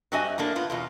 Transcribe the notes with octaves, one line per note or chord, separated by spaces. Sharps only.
G2 C4 F#4 D#5 E5 G#5
A2 A3 A#3 D4
B3 F4 B4
E2 B2 F4